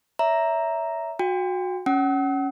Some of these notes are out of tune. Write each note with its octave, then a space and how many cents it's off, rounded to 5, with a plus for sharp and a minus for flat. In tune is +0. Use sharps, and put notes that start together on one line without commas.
C#5 +40 E5 +0 A#5 +0
F#4 -20 G5 +30
C#4 +0 F#5 +35 E6 -45